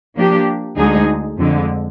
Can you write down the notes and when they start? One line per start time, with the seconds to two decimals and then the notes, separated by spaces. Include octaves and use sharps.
0.15 F3 A#3 D4 G4
0.76 D2 D3 G#3 D#4 G#4
1.38 F2 D3 G#3